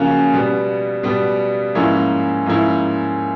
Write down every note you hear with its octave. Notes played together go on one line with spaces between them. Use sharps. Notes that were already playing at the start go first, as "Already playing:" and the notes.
Already playing: C#3 F3 A#3 C#4 F#4
B2 G3 B3
B2 G3 B3
G#2 F3 A#3 C#4 E4
G#2 F3 A#3 C#4 E4